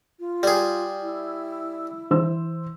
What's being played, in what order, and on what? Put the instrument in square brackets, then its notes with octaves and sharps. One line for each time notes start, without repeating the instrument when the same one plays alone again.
[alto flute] F4
[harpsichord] G3 G#4
[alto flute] E4
[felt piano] E3 C5 E6